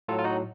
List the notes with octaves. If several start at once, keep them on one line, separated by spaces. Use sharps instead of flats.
A2 F#3 F4 A4
F4
D#4 F#4